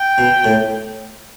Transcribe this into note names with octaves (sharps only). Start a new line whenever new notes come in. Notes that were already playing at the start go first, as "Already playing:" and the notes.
Already playing: G5
B2
A2